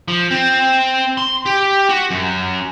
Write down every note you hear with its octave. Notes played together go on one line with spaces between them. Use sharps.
F3
C4
C6
G4
F#4
F#2